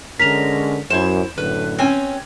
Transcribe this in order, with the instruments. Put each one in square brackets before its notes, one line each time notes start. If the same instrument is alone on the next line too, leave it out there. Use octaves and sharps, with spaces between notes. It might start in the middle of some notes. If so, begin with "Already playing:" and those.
[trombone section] D3 G#3 C#4 [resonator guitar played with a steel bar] A#4 [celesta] B6 F7
[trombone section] F#2 [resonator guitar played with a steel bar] E4 C5 [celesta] E7
[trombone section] F#2 A2 D3 [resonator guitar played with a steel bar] B4
[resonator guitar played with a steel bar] C4 C#4 G#5